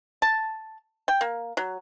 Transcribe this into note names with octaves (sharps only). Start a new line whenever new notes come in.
A5
G5
A#3
F#3